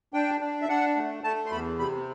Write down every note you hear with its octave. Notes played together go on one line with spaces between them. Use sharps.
D4 G5
D4
E5
D4 F#5
A3
A3 A5
C6
E2 B5
C3 B5